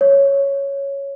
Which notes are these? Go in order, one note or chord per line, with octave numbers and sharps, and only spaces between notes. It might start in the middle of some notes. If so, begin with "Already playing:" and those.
C#5